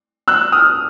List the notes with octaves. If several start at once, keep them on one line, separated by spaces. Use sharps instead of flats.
E6 F#6
D#6 F6